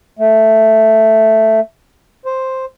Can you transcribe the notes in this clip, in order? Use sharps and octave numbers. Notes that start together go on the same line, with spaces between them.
A3
C5